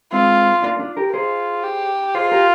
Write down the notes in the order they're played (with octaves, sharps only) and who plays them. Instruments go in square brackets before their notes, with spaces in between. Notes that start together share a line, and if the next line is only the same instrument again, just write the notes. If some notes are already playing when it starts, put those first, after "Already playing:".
[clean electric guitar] G#3 C4 [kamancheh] F4
[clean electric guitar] A#3 D4
D4 F4
G4 A#4
[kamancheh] F4 [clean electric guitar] G#4 C5
[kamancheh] G4
[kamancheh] F4 [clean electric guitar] G#4 C5
[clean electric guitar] G4 A#4